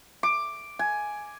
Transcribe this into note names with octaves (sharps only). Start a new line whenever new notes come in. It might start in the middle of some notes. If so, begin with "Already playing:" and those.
D6
G#5